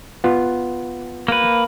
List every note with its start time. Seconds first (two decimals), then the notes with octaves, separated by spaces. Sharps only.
0.24 B3 F4
1.28 A#3 B4